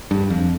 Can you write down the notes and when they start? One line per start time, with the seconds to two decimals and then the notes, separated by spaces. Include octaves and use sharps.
0.11 G2
0.30 F2